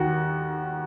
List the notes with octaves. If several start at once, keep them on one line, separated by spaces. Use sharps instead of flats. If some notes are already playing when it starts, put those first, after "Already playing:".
Already playing: D#2 D#3 F#4